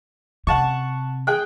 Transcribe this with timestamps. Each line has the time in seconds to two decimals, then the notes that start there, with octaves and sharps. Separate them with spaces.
0.47 C3 F#5 A5 C#6
1.27 G#4 G5 F#6